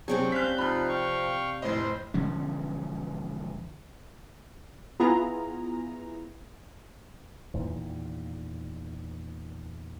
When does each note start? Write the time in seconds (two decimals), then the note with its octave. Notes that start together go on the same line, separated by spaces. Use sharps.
0.08 C3 F#3 C4 D4 G#4 G5 C#6
0.32 C#4 C5 F5 F#6 G6 B6
0.58 F3 D#4 F4 B5 F#6
0.89 F5 G5 C#6
1.62 F1 A2 C5 D#5 C6
2.14 E1 D3 F3 C#4
5.00 B3 E4 F4 G#4 A#5
7.54 E2 A#2 D#3